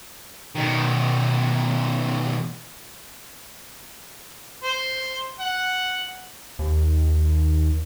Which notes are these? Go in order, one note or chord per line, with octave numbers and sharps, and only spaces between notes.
B2 D#3
C5
F#5
D#2